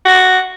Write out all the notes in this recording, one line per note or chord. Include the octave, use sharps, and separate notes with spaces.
F#4